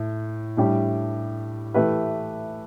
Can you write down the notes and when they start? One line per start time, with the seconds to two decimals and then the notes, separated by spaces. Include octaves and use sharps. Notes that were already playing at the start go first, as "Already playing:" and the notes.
Already playing: A2
0.57 A2 G3 D4 G4
1.74 E3 A3 G4 B4